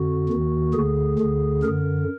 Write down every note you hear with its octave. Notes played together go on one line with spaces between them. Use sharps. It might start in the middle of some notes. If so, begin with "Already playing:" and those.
Already playing: F2 D3 F#4
D#2 D#3
D2 D3 G#4
D2 D3
F#2 D3 A#4